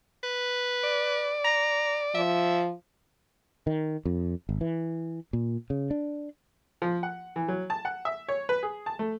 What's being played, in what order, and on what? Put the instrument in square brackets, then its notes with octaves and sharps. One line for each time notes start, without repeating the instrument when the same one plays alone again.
[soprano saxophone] B4
[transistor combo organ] D5
[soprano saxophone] A#5
[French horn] F3 [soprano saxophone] E5
[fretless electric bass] D#3
F2
G#1
E3
A#2
C#3
D4
[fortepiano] F3
F#5
E3
F#3
A5
F#5
E5
C#5
B4
G#4
A5
A3